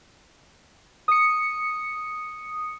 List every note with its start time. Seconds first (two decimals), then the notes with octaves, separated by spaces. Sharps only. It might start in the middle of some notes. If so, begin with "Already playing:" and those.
1.08 D#6 C#7